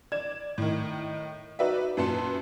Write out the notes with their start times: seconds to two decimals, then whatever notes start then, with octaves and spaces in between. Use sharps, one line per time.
0.12 D5 G#6 E7
0.58 A2 D#3
1.59 D#4 F#4 B4 D5 E5
1.97 F#2 A#2 B4 A5 C6 C#7